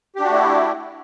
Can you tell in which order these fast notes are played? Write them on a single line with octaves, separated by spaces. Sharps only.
G4 D4 F#4 A3 E4